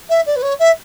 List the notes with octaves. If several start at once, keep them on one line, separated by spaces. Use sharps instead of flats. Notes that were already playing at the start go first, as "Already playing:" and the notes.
E5
D5
B4
C#5
E5